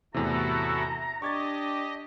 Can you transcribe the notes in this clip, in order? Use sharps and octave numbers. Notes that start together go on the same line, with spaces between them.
E2 A2 C3 E4 F#4 A4 A#5
D4 G4 D#5 C#6 G#6 A6